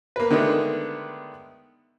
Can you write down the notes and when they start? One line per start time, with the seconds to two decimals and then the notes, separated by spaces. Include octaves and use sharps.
0.16 A#3 B4
0.31 D3 D#3 G#3 A3 B3